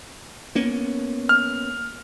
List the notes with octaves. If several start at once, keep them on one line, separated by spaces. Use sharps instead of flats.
A#3 B3 C#4
F6